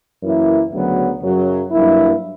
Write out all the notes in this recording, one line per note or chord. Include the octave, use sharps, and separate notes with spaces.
F#2 E3 A#3 E4
D2 C#3 F#3 B3
F#2 C#3 F#3
G2 F#3 A#3 E4